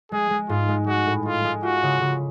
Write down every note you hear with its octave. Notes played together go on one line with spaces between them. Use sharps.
G#3 G#4
G#3
G#2 F4
G#3
G#3 F#4
A2
G#3 F4
G#3
F4 F#4
C#3
C#3